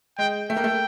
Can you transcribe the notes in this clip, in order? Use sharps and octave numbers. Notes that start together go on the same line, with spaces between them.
G#3 G5
A3 G5
A#3
A3